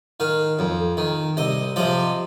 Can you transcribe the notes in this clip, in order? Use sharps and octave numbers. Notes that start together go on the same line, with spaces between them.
D#3 F5
F2
D#3
C2 D#5
C3 F3 D#5